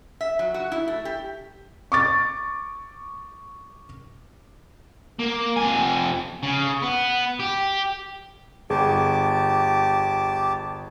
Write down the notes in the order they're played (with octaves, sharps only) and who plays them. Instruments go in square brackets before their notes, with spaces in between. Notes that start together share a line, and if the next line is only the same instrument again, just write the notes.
[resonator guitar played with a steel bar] E5
F#3
F#4
E4
A3
G4
[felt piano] C#6 D6 A6
[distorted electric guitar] A#3
F2 G#5
C#3
B3
G4
[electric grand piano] G1 [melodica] G4 A5 D6 [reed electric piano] G#4